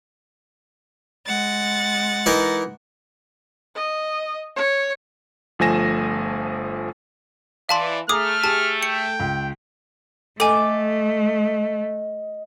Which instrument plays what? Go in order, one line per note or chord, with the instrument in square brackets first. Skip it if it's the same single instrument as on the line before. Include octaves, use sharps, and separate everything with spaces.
[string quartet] G#3 F#5 A6
[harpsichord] E3 D#4 A#4
[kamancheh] D#5
C#5
[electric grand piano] G1 F3 A3 G#5 A#6 E7
[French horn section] E3 [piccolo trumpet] D5 [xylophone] F5 A5 C6
[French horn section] A3 [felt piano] G#4 A#5 [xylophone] D6 D#6 [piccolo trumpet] F6
[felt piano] G4 G#4 [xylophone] A5
[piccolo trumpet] G5 [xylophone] C#7
[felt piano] C#2
[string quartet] A3 [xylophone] A4 G#5 [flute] D#5 [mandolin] D6